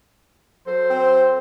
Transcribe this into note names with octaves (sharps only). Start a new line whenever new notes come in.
F#3 A4 C5
C4